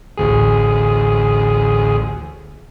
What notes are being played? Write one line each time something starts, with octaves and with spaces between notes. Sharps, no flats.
A1 D2 G#4